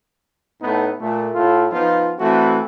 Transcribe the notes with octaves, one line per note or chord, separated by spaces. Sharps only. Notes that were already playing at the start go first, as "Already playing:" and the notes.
A2 A3 B3 D#4
A#2 A3
A2 A3 F4
F3 B3 D#4 F4
E3 A3 C4 F#4